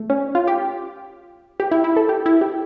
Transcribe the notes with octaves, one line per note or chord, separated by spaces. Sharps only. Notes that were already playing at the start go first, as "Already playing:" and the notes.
Already playing: A3
C#4
F4
G4
G4
E4
E4
A4
G4
E4
G4